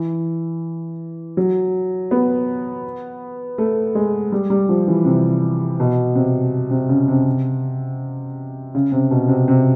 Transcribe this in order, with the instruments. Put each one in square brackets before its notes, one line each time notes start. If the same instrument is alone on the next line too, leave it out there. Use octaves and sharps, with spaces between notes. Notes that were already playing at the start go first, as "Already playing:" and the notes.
Already playing: [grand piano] E3
F#3
B3
A3
G#3
G3
G3
F3
E3
C3
B2
C3
C3
C#3
C3
C#3
C3
B2
C3
C3